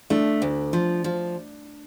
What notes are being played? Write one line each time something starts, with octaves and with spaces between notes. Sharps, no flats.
A3 D4
D2
F3
F3